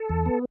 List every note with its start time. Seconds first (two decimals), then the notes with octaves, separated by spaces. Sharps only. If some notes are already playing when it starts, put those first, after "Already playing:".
Already playing: A4
0.09 E2
0.26 B3